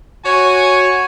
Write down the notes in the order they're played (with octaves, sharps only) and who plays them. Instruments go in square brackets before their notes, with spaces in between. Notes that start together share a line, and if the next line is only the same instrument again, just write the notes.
[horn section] F#4 C#5 G#5